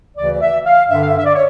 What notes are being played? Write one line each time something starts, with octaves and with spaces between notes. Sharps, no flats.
D2 C#3 E3 D5
D5
E5
F5
G2 D3 E5
F5
E5
E5
D5
C#5